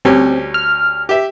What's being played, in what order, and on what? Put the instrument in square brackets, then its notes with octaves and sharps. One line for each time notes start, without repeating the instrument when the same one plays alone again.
[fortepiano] D2 G3 C#4 [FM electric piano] C4
[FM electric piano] F6
[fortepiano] G4 E5